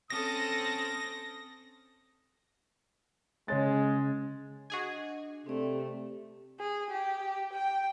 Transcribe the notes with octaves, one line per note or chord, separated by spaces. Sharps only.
C4 C#4 A4 D#6 A#6
C#3 G#3 C#5 A6
D4 F#4 G#4 D#5 G#5
C3 A3 C4 D5
G#4
G4
G5